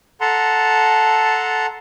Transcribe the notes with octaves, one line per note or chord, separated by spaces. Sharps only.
A4 F#5 A5 A#5 C6